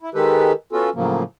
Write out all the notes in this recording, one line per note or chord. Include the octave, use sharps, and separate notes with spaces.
E4
D#3 G#3 G4 A4 B4
B3 C#4 F4 F#4 A4
A2 C#3 F3 F#3 A#3